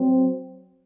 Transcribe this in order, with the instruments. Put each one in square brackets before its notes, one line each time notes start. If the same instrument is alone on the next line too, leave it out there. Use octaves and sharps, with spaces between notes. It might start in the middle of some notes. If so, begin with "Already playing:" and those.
Already playing: [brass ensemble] F#3 C4